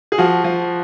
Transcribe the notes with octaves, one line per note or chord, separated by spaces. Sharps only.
G#4
F3 F#4
F3